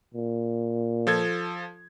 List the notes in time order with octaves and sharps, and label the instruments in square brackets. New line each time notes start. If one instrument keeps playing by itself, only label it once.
[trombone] A#2
[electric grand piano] F3 A4 G#6